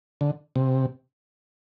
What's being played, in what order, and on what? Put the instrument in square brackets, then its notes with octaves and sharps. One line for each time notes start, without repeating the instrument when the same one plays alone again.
[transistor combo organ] D3
C3